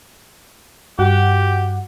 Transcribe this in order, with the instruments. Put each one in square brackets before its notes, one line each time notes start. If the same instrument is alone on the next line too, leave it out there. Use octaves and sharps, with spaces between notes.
[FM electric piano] G2 F#4 F#5 [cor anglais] G4